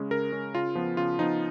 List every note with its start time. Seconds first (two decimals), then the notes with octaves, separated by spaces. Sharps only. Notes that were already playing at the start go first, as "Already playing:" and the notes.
Already playing: C#3 G#3 C#4
0.11 C#3 A#4
0.32 G#3 C#4
0.54 C#3 F4
0.75 F3 B3
0.97 C#3 F4
1.19 F3 B3 D#4